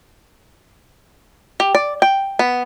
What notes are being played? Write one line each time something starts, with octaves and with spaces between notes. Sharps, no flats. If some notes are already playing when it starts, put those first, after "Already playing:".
G4
D5
G5
B3